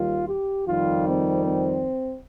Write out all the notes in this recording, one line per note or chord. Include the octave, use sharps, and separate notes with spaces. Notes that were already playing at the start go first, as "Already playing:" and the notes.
Already playing: D#2 D#3 G3 F4
G4
F2 D#3 G3 F4
C4
C4